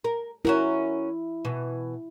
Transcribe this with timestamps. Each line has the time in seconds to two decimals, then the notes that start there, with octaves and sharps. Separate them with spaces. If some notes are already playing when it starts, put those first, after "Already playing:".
0.04 A#4
0.45 C#4 E4 F#4 A#4
1.45 B2 E3